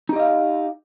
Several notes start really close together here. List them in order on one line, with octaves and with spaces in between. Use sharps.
D#4 G4 D#5 F5